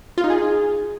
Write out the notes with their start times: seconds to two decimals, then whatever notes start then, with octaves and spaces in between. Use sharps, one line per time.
0.18 F4
0.24 D#4
0.30 G#4